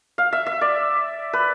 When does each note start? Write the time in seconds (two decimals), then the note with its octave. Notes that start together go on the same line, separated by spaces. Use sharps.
0.18 F5
0.33 E5
0.46 E5
0.61 D5
1.33 B4